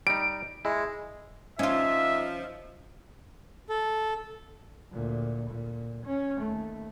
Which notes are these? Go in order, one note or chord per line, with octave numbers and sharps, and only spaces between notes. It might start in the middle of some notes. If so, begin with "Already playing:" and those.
G3 D#4 D7
G#3 E4
F3 C#4 D#4 F4 E5
A4
D2 A#2
A#2
C#4
D#2 A3